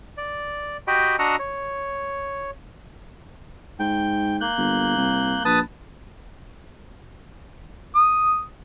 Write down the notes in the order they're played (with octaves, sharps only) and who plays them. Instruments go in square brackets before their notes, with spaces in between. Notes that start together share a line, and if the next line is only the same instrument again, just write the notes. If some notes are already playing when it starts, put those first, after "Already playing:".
[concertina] D5
F#4 G4 D#5 G5 B5
D4 F#4 D#5 F#5 A#5 E6
C#5
[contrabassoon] G#2 [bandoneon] G5
[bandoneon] A#3 F#6 G6
[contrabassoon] G1
C2
[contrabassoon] A#1 [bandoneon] B4 A5 D#6
[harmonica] D#6